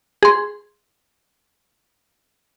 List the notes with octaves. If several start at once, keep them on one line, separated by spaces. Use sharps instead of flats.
G#4 C6